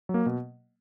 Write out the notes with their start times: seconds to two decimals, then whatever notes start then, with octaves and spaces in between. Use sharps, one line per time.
0.09 F#3
0.14 A#3
0.26 B2